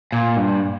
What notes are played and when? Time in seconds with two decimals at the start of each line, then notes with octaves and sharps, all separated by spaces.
0.12 A#2
0.36 G2